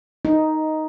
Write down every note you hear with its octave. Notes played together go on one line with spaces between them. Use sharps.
D#4